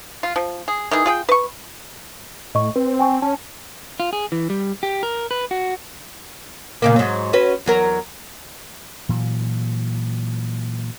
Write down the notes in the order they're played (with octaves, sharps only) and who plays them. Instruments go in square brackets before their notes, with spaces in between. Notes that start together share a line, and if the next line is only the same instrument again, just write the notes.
[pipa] F4
F3
G#4
D#3 E3 G#4
F4 G#4 G5
B4 C#6
[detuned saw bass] A2 [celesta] D#5 C#6
[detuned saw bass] C4 [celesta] B4
[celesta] G5 G#5 C#6
[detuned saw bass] C#4 [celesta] A5
[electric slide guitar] F4
G#4
E3
G3
G4
A#4
B4
F#4
[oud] A#2 C#3 A#3
G#2 F#3
C#4 F#4 B4
E2 F#3 A#4
[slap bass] A#2 E3 F#3